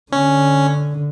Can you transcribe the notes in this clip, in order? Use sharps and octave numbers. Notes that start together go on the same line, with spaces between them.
D3 C#4